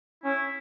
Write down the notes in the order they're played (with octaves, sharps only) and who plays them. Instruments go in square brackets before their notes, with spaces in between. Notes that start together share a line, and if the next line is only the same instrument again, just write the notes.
[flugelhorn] C#4 [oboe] E4